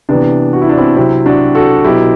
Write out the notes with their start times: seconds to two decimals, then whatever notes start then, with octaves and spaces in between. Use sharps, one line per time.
0.09 C3 E3 B3 D4
0.53 F#4
0.61 E4
0.69 D4
0.78 C4 E4
0.96 C3 F#3 C4 E4
1.26 D4 F#4
1.55 F#4 A4
1.84 B2 F#3 E4 G4